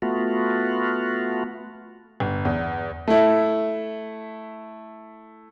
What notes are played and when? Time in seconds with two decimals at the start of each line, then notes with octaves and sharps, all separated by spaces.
0.02 A3 B3 F4 F#4
2.20 G1
2.45 E2
3.08 A3 E4